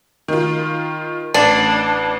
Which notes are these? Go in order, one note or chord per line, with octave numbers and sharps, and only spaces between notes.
D#3 F4
A1 D4